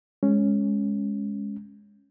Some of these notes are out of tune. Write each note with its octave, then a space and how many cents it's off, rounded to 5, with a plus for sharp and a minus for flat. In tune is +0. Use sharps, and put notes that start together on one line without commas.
G#3 -5 C#4 +0